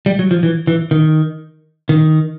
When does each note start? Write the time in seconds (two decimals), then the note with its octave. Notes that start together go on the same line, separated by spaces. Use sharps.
0.06 G3
0.19 F#3
0.31 F3
0.43 E3
0.67 E3
0.91 D#3
1.89 D#3